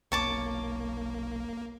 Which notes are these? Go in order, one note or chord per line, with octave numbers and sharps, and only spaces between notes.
F1 B1 A#3 C#5 A5 D6